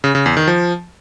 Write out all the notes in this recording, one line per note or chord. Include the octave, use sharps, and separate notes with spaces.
C#3
C#3
E2
D#3
F3